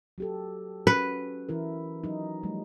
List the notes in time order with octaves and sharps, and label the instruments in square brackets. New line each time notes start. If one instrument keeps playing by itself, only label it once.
[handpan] F#3 G4 A4
[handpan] C#4 F#4 [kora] B4
[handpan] E3 E4 A#4
F#3 D#4
F3 G3 A3